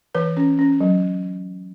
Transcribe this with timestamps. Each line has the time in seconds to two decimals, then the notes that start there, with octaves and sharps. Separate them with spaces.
0.15 E3 B4
0.37 C#4
0.59 C#4
0.81 F#3